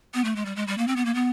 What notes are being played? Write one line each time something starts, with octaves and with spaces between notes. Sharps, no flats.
B3
A3
G#3
G3
G#3
G3
A#3
C4
B3
A#3
B3